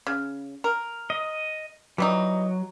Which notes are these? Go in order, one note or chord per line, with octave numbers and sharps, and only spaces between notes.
C#3
A#4
D#5
E3 F#3 G3 D#4